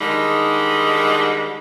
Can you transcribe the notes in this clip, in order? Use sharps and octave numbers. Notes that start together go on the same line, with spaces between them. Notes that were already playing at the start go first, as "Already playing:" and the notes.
D3 D#3 G3 G#3 D#4